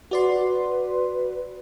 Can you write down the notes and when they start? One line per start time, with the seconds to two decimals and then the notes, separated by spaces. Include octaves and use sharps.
0.11 F#4 B4 D5 C6